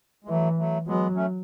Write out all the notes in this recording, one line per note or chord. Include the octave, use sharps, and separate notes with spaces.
G#3
E3 F#3 A3
F#3 A3
F#3 G#3 B3
A3 C#4